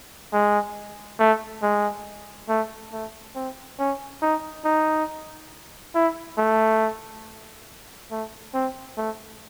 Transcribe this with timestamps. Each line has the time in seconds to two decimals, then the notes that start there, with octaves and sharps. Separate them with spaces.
0.33 G#3
1.19 A3
1.62 G#3
2.49 A3
2.93 A3
3.35 C4
3.79 C#4
4.22 D#4
4.65 D#4
5.95 E4
6.38 A3
8.11 A3
8.54 C4
8.97 A3